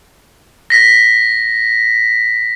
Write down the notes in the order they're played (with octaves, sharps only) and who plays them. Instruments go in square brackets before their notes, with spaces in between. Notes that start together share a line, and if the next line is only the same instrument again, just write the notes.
[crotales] A#6 B6